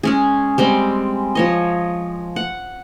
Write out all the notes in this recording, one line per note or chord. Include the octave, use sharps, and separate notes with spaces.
G#3 C#4 G#4
G3 G#3 C4
F3 C#5 D#5
F#5